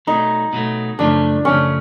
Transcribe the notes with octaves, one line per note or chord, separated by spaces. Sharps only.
B2 F#3 A3 D#4
B2 F#3 A3
F#2 C#3 F3 A3 D4
F#2 C#3 F3 A3 C#4